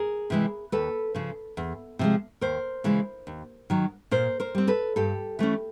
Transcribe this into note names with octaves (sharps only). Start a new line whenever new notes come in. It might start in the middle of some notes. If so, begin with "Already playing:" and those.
Already playing: G#4 A#4
C3 E3 G#3
D#2 A4 B4
C#3 F3
E2
C3 F3 G#3
D#2 A#4 C5
C#3 E3 G#3
D#2
D#3 F#3
A#2 A#4 C5
A#4 C5
G3 C4
A4 B4
G2 G4 A4
E3 A3 C#4